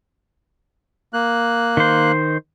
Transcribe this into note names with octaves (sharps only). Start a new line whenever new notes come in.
A#3 F#6
D#3 C5